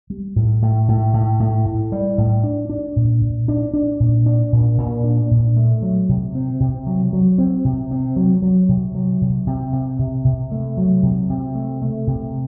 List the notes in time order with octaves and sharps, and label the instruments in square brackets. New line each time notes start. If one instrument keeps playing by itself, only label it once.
[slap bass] G3
A2
A2
A2
A2
A2
A2
G3
A2
D4
D4
A#2
A#2
D4
D4
A#2
D4
A#2
A#2
D4
A#2
A3
F#3
C3
C4
C3
F#3
F#3
C4
C3
C4
F#3
F#3
C3
F#3
C3
C3
C3
C3
C3
A3
F#3
C3
C3
A3
A3
C3